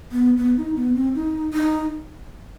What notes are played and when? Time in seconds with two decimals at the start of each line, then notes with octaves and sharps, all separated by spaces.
0.12 B3
0.37 B3
0.57 D#4
0.76 B3
0.95 C4
1.15 D#4
1.53 D#4